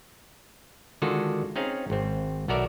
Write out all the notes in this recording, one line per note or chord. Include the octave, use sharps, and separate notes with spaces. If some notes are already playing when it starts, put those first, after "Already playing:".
D3 D#3 G#3 F4 F#4 A4
C4 C#4 D#4 G#4 F5
G#1 C4
B1 B3 F#4 A#4 D5 E5